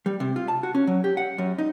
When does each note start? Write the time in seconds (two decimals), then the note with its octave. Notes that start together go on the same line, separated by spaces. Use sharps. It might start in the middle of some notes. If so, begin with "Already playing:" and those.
0.06 G3
0.20 C3
0.36 F4
0.48 A5
0.63 F#4
0.75 C#4
0.87 F#3
1.04 G4
1.17 F#5
1.38 F#2
1.58 D#4